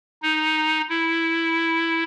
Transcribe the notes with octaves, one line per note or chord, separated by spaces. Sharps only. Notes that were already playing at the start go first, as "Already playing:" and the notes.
D#4
E4